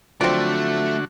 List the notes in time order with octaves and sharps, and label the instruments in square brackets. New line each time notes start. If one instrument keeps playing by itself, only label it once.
[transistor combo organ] D3 F#4 [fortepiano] F3 F#3 [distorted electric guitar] A3 [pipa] C4 D5